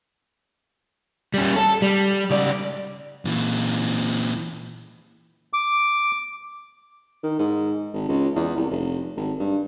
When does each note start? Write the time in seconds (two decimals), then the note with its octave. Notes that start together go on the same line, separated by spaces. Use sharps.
1.34 G3 C#4
1.56 A4
1.82 G3
2.31 C#2 D5
3.25 A#2 E3
5.53 D6
7.23 D#3
7.39 G#2
7.93 G#1
8.08 C#2
8.35 E2
8.56 C2
8.71 F1
9.17 G#1
9.39 G2